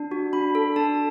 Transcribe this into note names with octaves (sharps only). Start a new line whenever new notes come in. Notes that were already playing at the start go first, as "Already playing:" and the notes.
Already playing: D4
F#4
D4 B5
A4
D4 A5